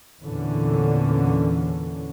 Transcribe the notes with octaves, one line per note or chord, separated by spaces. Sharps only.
E2 A#2 D3 E3 C#4